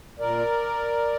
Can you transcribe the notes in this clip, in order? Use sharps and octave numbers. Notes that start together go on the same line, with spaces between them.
A#2 A#4 D5